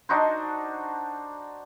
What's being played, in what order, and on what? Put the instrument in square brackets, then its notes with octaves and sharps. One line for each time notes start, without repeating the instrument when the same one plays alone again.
[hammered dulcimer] D4 D#4 F#4 C5